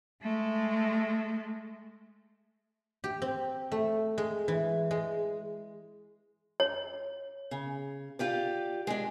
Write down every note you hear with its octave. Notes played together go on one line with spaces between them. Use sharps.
G#3 A3
G4
C4
A3
G#3
E3
G#3
C#5
C#3
F4 G4 D5
G#3 D4